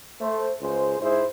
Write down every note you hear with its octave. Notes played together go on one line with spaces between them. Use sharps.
A3 C5
C#2 G#4 C5
G#2 E4 G#4 C5